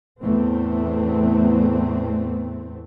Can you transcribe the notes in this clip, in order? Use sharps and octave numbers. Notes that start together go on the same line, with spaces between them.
E2 A2 A3 C4